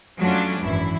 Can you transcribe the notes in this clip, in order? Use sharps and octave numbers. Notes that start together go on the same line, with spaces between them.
F2 F#3 A3 C#4 D4 F4
G#1 F#2 E3 E4